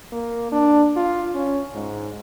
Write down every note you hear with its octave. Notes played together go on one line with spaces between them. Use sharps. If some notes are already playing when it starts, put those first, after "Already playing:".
A#3
D4
F4
C#4
G#2